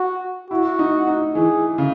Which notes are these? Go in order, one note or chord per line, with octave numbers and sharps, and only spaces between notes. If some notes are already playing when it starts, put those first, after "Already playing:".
Already playing: F#4
E4 F#4
D#4
D#4
E3 G#4
C#3